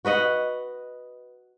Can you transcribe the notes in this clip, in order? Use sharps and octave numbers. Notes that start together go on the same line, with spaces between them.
F#4 B4 D#5 F#5